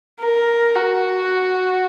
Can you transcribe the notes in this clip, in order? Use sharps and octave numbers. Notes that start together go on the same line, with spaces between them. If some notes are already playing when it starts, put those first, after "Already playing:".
A#4
F#4